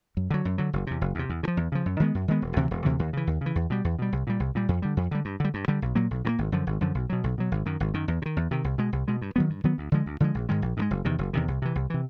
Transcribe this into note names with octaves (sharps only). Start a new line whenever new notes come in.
F#2
D3 F#3
F#2
D3 F#3
F#1
E2 C3
F#1
E2 C3
E2
C#3
F3
E2
C#3 F3
F#2
D#3 G#3 B3
F#2
D#3 G#3 B3
E1
D2 C3 E3
E1
D2 C3 E3
D#2
C#3 E3
D#2
C#3 E3
E2
B2 G3
E2
B2 G3
C2
A#2 G3
C2
A#2 G3
F2
D3 G3
F2
D3 G3
G2
D3 G3
G2
D3 G3
B1
A#2 F#3 A#3
B1
A#2 F#3 A#3
G#1
F#2 D3 F3
G#1
F#2 D3 F3
B1
B2 F#3
B1
B2 F#3
G#1
F#2 D#3
G#1
F#2 D#3
E2
C3
D#3
E2
C3 D#3
C2
B2 G#3
C2
B2 G#3
G2
D#3 F#3 B3
G2
D#3 F#3 B3
D2
D3 F3 G#3
D2
D3 F3 G#3
A#1
G#2 D#3 G#3
A#1
G#2 D#3 G#3
F#1
E2 C3 D#3
F#1
E2 C3 D#3
C2
C3 E3
C2
C3 E3